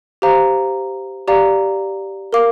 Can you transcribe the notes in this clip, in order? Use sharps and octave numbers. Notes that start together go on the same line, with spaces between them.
G4 C5 F5 A#5
G4 D5 F5 A#5
A#4 F5 D6